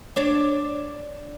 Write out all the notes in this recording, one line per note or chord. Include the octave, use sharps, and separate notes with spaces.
D4 C#5 D5